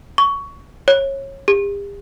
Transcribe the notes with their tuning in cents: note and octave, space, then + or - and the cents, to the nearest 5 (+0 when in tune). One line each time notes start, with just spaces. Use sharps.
C#6 +15
C#5 -20
G4 +40